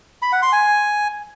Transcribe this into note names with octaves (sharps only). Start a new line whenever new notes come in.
B5
F#5
C6
G#5